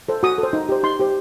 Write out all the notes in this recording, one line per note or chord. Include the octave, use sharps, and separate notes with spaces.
A4 C5
F#4 D#6
A4
C5
D#4
G4 C5
D#4 C6
G4 C5